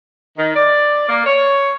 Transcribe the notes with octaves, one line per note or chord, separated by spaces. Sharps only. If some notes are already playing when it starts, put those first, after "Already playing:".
D#3
D5
A#3
C#5